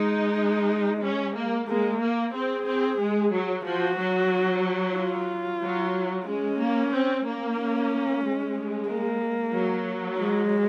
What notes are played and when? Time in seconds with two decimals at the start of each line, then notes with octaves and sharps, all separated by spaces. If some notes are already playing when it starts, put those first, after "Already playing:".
Already playing: G#3 D#4
1.02 C#4
1.35 A#3
1.68 G#3 A#3
2.01 A#3
2.34 C4 G#4
2.66 C4
2.99 G#3
3.32 F#3
3.65 F3 F#4
3.98 F#3
4.96 F4
5.62 F#3
6.26 G#3 C#4
6.59 A#3
6.92 C4
7.26 A#3
7.58 C#4
8.23 G#3
8.89 A#3
9.54 F#3
10.20 G#3